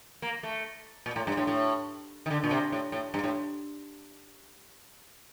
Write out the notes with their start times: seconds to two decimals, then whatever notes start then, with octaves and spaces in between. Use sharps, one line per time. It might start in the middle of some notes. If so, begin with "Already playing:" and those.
0.22 A#3
0.43 A3
1.06 A#2
1.16 A2
1.27 G2
1.37 A2
1.47 A2
2.26 D#3
2.30 D3
2.44 A#2
2.51 C3
2.72 A2
2.92 A2
3.14 G2
3.24 A2